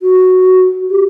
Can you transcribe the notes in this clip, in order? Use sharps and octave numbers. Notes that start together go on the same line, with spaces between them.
F#4
G4